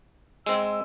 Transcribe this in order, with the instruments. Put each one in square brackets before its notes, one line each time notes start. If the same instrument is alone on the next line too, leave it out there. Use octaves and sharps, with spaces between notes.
[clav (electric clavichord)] G#3 C4 [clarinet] E6